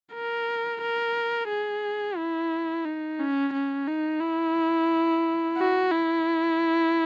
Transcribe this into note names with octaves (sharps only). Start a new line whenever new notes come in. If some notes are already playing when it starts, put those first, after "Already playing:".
A#4
A#4
G#4
E4
D#4
C#4
C#4
D#4
E4
F#4
E4